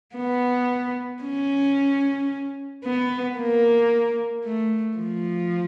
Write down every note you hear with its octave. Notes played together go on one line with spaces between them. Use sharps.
B3
C#4
B3
A#3
A3
F3